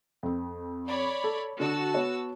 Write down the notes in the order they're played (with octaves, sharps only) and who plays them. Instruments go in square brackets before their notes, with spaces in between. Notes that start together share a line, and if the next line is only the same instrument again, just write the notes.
[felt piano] F2 C4
[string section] C#5 D5 B5
[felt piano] A4
[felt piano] D3 D4 [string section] F#4 A5 E6
[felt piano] B3 C#5